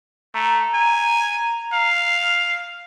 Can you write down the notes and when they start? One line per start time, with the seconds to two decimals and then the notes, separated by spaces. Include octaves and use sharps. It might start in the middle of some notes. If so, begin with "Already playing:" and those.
0.34 A3 A#5
0.74 G#5
1.73 F5